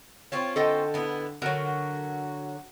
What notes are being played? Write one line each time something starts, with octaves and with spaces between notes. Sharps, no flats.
C4 C#4 F4 C#5
D3 A4 D#5 G5
B3 E4
D3 F#3 F#4 A#4
F#4